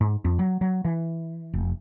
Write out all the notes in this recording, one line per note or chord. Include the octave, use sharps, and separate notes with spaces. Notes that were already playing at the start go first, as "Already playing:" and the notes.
G#2
F2
F#3
F#3
E3
F1